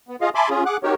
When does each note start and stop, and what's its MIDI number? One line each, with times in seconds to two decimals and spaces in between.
0.08 0.16 59
0.21 0.30 65
0.21 0.30 68
0.21 0.30 75
0.21 0.30 77
0.35 0.49 76
0.35 0.49 80
0.35 0.49 81
0.35 0.49 83
0.35 0.49 84
0.35 0.49 86
0.50 0.64 61
0.50 0.64 65
0.50 0.64 68
0.66 0.77 68
0.66 0.77 78
0.66 0.77 86
0.66 0.77 90
0.83 0.95 60
0.83 0.95 63
0.83 0.95 66
0.83 0.95 67
0.83 0.95 70
0.83 0.95 73